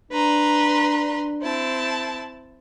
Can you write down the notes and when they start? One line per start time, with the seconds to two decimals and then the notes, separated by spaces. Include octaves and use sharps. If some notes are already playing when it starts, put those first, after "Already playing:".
0.12 D4 B4 A#5 C6
1.41 C4 E4 A5